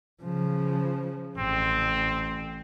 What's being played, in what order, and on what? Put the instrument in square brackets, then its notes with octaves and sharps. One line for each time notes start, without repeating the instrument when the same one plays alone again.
[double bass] C#3 F3
[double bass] A1 [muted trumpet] C4